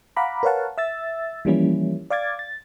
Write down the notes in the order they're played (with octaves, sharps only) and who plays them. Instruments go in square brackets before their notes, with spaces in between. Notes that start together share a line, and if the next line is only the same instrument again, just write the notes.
[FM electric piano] F5 F#5 A#5 B5 D6
A#4 B4 C#5 F5 F#5 A5
E5 E6 A6
E3 F3 G3 A#3 C#4 E4
D5 F5 D6 G#6 A6
A6